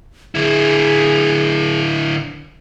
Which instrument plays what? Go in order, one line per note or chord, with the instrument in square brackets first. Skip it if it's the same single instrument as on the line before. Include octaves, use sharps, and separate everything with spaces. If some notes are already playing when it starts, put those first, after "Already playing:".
[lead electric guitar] D3 E4 [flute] G#4